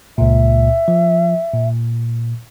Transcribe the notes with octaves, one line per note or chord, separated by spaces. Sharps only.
C#2 A#2 E5
F3
A#2